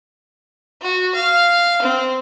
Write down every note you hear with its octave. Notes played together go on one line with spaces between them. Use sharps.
F#4
F5
C4